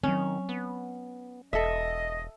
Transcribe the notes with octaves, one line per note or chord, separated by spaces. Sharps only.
D#3 F#3 C4 C#4
B3
E1 A4 D#5 E5